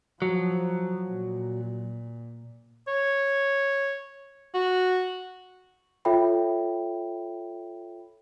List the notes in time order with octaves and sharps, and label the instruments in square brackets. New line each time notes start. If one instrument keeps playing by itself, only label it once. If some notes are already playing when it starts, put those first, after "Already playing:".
[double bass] F3 [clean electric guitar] F#3
[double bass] A#2
[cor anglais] C#5
F#4
[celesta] F4 A4 C#5 E5 G5 B5